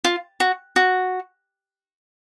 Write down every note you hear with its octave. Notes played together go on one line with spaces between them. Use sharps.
F4
F#4
F#4